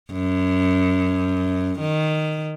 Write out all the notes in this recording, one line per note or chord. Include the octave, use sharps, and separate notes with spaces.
F#2
D#3